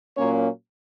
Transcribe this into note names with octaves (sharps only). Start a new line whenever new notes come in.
A#2 F#3 A#3 C#4 C#5